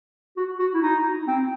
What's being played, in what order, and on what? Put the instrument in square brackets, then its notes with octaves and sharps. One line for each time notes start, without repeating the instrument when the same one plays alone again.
[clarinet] F#4
F#4
E4
D#4
C4